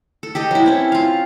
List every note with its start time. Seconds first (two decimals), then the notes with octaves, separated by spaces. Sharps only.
0.23 A4
0.35 G4 A4 D#5
0.51 F#3 E4
0.66 C4 C#4
0.92 F4 F5